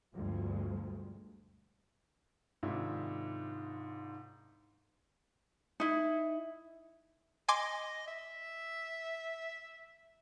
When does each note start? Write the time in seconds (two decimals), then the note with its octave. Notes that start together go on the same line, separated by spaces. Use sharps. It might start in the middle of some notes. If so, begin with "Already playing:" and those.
0.14 D2 G2 B2 F3 G#3
2.63 G#2 C3 D#3 D4 E4 F4
5.80 D#4 E4
7.49 D#5 G#5 C6 D6
8.07 E5